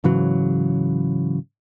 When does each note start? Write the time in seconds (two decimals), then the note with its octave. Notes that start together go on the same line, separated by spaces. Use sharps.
0.04 G#2 C#3 E3 F#3